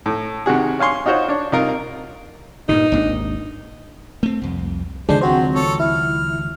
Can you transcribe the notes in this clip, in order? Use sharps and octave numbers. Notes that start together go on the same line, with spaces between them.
A2
C3 D#3 F#4 G#4
C#5 F5 G#5 C6 C#6
D#4 F4 F#4 C5 C#5
D4 C#5
C2 D#4 F4 A#4
G2 A#2 C#3 D#4
G#1 D#2 D4
A3 C4
C2 F2
C#2 D3 D#3 F3 G#3 D4 C5
F#3 C4 F#4 C5
A4 C#5
E4 F6